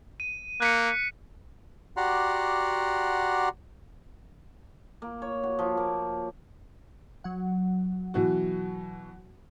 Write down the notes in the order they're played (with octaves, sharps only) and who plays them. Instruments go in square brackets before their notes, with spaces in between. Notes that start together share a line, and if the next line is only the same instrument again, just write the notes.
[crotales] D#7
[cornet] A#3 [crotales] F#6 B6 C#7
[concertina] F#4 G4 D5 F#5 A#5 C6
[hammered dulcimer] A#3
C#5
F#4
F3
A#3
[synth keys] F#3 F#5
[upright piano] B2 E3 F#4